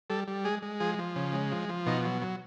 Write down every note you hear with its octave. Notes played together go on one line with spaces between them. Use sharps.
G3 A4
G3
G#3 G#4
G#3
F3 G#4
F3
C#3
G#3
F3
F3
B2 D#4
F#3
F#3